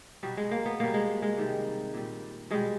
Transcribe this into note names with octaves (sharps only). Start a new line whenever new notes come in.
B2 F#3 G3
G#3
A#3
B3
B2 G3 A#3
G#3
G#3
C3 D#3 G3
A#2 G3
B2 G3 G#3